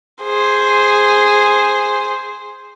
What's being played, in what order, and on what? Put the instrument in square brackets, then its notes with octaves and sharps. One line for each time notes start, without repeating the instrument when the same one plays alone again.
[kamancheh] G#4 C5